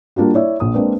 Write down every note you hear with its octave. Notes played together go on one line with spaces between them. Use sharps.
G3 A#3 D4 F4 F#4
E4 C#5 D5 E5
A#1 D#6
G#3 A#3 C4 D4 B4 D5